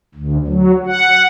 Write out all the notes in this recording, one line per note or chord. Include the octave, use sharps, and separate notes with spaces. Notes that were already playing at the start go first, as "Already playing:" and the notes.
D2
F#3
F#5